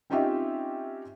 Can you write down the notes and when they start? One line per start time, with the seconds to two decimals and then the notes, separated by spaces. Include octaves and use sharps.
0.10 C4 C#4 D#4 F4 G4 E5